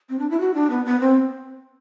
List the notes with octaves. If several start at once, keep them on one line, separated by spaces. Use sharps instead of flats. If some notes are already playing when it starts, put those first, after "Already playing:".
C4
D4
E4
F#4
D4
B3
B3
C4